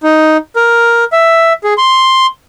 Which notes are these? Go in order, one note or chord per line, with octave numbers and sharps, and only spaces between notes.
D#4
A#4
E5
G#4
C6